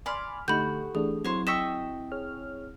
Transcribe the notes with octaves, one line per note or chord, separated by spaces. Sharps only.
D5 G#5 B5 C6 F6
D3 A3 D#4 F#4 G4 A4 B5 G6
E3 A3 D4 G#4
F#3 C4 E4 C5 C#5
D#5 G5 C#6 E6 B6 E7
G#4 C#5 F6